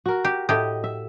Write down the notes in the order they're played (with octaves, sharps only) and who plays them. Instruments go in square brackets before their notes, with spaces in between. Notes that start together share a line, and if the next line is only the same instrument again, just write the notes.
[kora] F#4 A#4
[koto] G4
[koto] A2 G4 [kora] D#5
[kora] E5